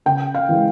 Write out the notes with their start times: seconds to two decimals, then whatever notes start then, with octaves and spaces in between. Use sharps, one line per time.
0.06 C#3 G5
0.35 F5
0.49 E3 G#3